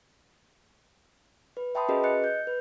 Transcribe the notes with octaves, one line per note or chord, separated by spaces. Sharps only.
B4
E5 G5 A5 B5 C6 D#6
C#4 F#4 G#4 A#4 B4 D#5
D#5 F#6 C#7
G6
B4